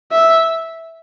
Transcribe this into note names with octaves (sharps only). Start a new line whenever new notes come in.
E5